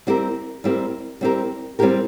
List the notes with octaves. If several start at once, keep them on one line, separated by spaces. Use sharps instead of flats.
G3 C4 E4 G4 A#4
G3 C4 E4 G4 A#4
G3 C4 E4 G4 A#4
G3 C4 E4 G4 A#4